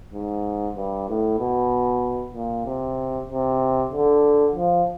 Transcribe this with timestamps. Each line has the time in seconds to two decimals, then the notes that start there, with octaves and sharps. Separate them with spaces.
0.14 G#2
0.76 G2
1.09 A2
1.40 B2
2.34 A#2
2.66 C3
3.29 C3
3.92 D3
4.55 F3